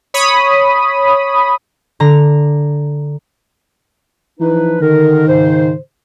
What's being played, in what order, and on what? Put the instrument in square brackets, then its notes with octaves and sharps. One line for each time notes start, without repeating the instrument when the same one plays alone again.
[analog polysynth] C#5 B5 D#6
[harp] D3 A#5
[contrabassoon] E3 [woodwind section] F3 D#4 B4
[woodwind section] D3 A#4 [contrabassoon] D#3
[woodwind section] G#2 C#3 C5